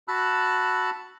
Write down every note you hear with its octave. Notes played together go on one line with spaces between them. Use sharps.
F#4 A5 B5 E6 F#6